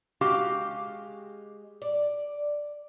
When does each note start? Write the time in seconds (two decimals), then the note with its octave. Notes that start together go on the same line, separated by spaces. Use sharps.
0.21 G#3 F#4 G4 F5
1.82 D5